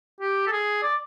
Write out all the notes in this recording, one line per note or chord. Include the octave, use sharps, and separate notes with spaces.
G4
A4
G#4
D5